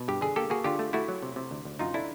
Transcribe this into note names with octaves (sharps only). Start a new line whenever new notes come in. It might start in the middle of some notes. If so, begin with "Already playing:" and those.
Already playing: B2
G2 G4
D3 G#4
A#3 G4 A4
A#3 F#4 G#4
D3 F4 G4
A3
A3 E4 F#4
F#3
C3
C3
D2
D2
F#2 D#4 F4
D3 D4 E4